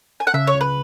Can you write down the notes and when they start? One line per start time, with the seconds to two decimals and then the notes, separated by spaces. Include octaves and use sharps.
0.20 G#5
0.27 F#5
0.34 C#3 E5
0.47 C#5
0.55 C#2
0.61 B4